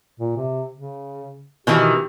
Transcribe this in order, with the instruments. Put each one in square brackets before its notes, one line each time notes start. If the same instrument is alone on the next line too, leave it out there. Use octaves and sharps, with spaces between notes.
[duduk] A#2
C3
C#3
[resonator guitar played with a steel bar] B2 D#3 E3 [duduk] G4